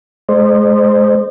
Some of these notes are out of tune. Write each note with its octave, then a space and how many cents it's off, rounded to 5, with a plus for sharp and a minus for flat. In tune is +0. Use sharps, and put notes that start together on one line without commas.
G#3 +30 C5 +0 D#5 -40